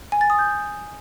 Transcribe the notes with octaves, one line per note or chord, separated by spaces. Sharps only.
G#5
A6
D#6
G6